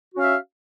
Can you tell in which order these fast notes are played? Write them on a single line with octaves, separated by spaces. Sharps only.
F#4 C#4 F5 E5